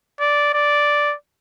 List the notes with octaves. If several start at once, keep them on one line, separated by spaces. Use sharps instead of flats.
D5
D5